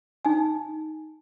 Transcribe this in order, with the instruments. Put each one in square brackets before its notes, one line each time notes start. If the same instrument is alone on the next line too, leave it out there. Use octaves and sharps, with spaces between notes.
[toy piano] D#4 G#5